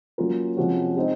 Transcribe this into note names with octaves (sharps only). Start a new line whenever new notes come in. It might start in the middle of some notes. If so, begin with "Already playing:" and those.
F#3 A#3 C#4 F4 A#4
C3 F3 G#3 C#4 F#4
G#3 C4 D#4